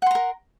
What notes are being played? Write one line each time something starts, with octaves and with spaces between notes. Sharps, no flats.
A#4 F#5 A#5 C6